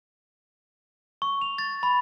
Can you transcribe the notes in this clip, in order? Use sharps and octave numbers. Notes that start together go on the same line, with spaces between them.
C#6
F7
A6
B5